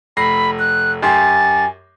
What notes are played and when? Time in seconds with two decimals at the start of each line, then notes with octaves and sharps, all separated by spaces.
0.17 F1 B5 A#6 C7
0.59 F#6
1.03 F#2 G4 G#5 C6 A6